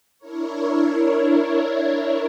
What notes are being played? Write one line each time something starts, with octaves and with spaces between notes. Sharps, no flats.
D4 E4 A#4 C#5